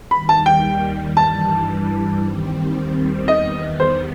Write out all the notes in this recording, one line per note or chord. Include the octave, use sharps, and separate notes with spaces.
D#2 D#3 G3 B5
A5
G5
G2 E3 G3 A5
D#2 D#3 G3 C4
E2 D#3 G3 B3 D#5
C5